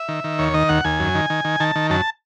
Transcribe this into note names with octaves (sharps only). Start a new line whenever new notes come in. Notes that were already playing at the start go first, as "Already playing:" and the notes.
Already playing: E5
D#3
D#3
D#2 C#5
D#3 D#5
D#2 F#5
D#2 G#5
F#2
D#3
D#3
D#3
D#3 A5
D#3
F#2 A5